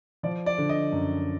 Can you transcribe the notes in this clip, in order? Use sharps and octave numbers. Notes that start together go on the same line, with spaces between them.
F3 D5
D5
D3
D#5
F#2